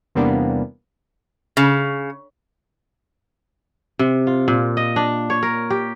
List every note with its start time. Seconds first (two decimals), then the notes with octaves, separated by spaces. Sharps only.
0.15 E2 C3 G3 A#3 B3 D4
1.57 C#3
3.99 C3
4.27 F4
4.48 A#2
4.77 D#5
4.96 D4
5.30 C#5
5.43 A#4
5.70 G4